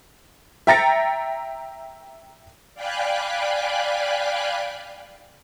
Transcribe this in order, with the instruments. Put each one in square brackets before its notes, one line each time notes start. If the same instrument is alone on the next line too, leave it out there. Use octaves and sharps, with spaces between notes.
[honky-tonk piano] E5 G5 A#5 A6 A#6 C#7
[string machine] D5 F5 G5 G#5 B5 F#6